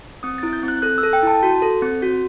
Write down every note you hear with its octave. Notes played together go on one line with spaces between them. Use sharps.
C4 D#6
E4 A6
G6
C4
F#6
A4 F#6
E6
A4
G5
E4 A5
F#4
A4
C4
F#4